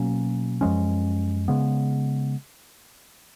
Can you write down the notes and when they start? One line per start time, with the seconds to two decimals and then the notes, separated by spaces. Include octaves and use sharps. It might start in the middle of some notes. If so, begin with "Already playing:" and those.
Already playing: B2 F#3 A#3 C#4
0.61 F#2 F3 G#3 C#4
1.48 C#3 G#3 B3